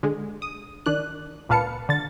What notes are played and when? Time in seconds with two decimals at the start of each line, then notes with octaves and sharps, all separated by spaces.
0.03 D3 G#3
0.42 D#6
0.86 D#3 D4 F#6
1.49 C#2 A#2 B4 F5 A5 C#7
1.89 D3 A6